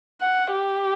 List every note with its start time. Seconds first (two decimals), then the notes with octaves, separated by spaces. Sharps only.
0.21 F#5
0.52 G4